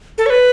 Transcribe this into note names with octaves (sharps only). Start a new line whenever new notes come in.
A4
C#5
B4